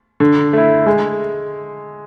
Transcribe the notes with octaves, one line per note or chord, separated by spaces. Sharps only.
D3
A3 E4
G#3